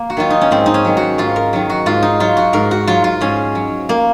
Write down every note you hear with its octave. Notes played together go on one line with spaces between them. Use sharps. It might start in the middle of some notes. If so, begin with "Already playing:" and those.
Already playing: A#3
F#4
D#3 F#3 F4
D#4
C#4
G#2 C4
D#4
C#4
D#3 F#3
F#4
G#2 F4
A#4
D#3 F#3
F#4
G#2 F4
D#4
F#3 F4
F#4
G#2 A#4
F#4
F#3 F4
F4
G#2 C#4
F#3
A#3